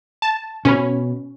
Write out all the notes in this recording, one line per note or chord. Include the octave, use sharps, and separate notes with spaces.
A5
B2 C#4 C5 B5